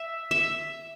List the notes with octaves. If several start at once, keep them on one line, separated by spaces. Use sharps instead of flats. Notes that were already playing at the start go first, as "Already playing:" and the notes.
Already playing: E5
E5